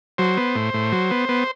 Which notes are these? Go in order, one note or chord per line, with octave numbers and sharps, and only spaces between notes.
F#3 C5
B3
A2
A2
F#3
B3
B3